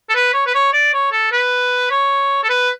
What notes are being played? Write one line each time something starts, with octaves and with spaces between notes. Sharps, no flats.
A4
B4
C#5
B4
C#5
D5
C#5
A4
B4
C#5
A4
B4